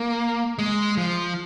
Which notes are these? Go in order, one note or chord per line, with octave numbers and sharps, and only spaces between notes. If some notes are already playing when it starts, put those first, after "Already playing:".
Already playing: A#3
G#3
F3